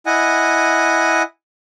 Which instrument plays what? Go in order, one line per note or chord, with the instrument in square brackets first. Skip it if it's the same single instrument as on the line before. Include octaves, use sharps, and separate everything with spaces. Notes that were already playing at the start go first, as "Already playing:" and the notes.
[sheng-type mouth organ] E4 D#5 F#5 G#5